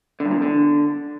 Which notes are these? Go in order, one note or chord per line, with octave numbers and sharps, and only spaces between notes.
D3
G2
A#2
E2
D3